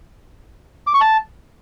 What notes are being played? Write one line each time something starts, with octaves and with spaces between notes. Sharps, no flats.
D6
C#6
A5